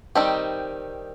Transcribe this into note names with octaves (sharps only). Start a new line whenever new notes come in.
D#3 G3 C4 D#4 G4